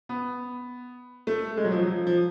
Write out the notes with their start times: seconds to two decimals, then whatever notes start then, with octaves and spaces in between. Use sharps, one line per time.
0.09 B3
1.27 A3
1.57 G#3
1.64 F#3
1.72 F3
1.78 F#3
1.87 F3
2.07 F3